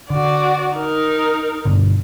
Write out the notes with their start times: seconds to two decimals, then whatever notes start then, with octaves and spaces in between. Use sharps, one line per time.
0.10 D3 F#4 D5
0.75 D#4 A#4
1.65 G2 B2 D3